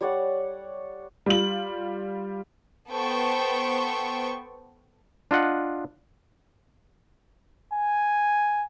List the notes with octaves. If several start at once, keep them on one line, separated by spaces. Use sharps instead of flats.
G3 C#5 D5 F#5
G3 F4 F#7
B3 A4 C5 G5 C#6
D4 F4 D#5 F#5
G#5